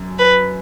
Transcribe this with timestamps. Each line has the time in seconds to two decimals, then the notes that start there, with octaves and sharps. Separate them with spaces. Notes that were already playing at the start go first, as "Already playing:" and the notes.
Already playing: F#2
0.19 B4